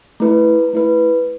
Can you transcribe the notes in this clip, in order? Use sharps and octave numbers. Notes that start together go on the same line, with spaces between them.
A3 E4 B4
A3 E4 B4